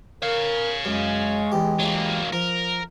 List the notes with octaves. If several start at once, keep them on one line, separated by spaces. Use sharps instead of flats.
A#4 C#5 F5
F#2 G#3
E2 G4
F#3 A#3
F3 A#4